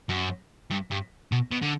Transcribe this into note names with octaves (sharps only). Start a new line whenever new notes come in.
F#2
G2
G2
B2
B2
D3